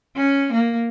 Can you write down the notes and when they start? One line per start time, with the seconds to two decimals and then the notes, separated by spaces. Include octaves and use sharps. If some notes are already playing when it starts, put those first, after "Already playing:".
0.16 C#4
0.53 A#3